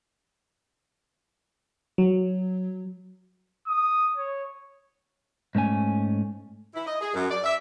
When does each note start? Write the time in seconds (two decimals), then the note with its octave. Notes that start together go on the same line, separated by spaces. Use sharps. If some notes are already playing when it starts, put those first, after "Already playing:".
1.98 F#3
3.68 D#6
4.17 C#5
5.55 G#2 A3 C#4 G#5
6.74 E4
6.87 D#5
7.01 G#4
7.14 F#2
7.31 D5
7.44 E5